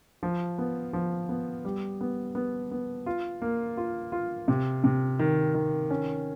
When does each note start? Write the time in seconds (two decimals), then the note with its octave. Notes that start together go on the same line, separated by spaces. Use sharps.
0.23 F3
0.58 B3
0.93 F3
1.29 B3
1.65 G3
2.01 B3
2.35 B3
2.71 B3
3.06 F4
3.42 A#3
3.77 F4
4.12 F4
4.48 C3
4.84 C3
5.19 D#3
5.54 D#3
5.90 C#4